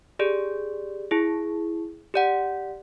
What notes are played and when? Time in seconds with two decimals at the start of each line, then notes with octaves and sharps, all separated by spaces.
0.19 G4 G#4 D5
1.11 E4 G#4
2.14 G4 D5 F#5